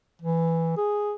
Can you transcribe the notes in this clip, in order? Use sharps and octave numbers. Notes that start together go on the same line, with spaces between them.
E3
G#4